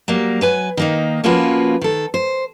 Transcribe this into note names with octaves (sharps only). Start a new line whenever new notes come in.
F#3 G3 A#3
F#3 B4 G#5
D#3 A#3 D#4
F3 A#3 C#4 F4 F#4 B4
D#3 A4
C5